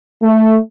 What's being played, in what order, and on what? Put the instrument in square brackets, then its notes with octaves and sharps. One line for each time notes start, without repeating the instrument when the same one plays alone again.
[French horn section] A3